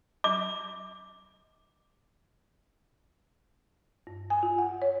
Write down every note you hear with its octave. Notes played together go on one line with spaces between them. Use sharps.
D6
G2
G#5
F4
F#5
C#5